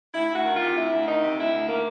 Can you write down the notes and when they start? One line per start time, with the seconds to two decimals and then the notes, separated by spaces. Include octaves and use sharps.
0.14 D2 E4
0.30 D2 F#4
0.45 D#3
0.55 F4
0.60 C3
0.76 D2 E4
0.91 D2
1.07 D#3 D#4
1.22 C3
1.37 D2 E4
1.52 D2
1.68 D#3 A#3